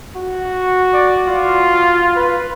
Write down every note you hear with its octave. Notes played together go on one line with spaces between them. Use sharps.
F#4
D5
F4
B4